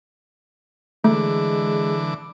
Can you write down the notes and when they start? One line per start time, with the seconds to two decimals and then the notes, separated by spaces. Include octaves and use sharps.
1.04 D3 E3 G#3 A3 D6